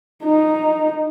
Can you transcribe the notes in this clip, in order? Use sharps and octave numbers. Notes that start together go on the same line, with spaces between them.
D#4